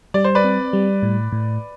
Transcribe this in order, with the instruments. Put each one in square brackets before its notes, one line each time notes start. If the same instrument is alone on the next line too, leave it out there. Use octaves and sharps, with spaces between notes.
[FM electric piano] G3 [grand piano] D5
[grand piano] C5
B4 D5
[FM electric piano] C4
G3
A2
A2